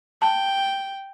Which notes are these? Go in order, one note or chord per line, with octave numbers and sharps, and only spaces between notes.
G5 A5